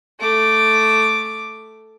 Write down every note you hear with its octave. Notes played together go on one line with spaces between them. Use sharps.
A3 D6